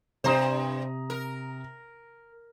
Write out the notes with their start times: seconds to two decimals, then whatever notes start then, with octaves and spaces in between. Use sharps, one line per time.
0.24 G2 C3 C5 A#5 D#6
1.10 A#4